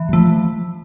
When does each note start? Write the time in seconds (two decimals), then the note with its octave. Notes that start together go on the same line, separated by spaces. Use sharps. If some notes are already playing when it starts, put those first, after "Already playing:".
Already playing: E3
0.09 G3
0.13 F3 A3